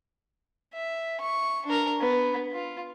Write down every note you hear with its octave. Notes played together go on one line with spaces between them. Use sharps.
E5
C#6
D4 A#4
B3
F4